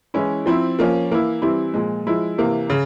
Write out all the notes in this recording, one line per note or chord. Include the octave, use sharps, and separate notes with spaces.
E3 G#3 C#4 E4
F3 C4 E4
F3 A#3 C#4
E3 A#3 E4
E3 G3 C4 E4
A#2 F3 G#3
F3 G#3 E4
C3 E3 A#3
C#3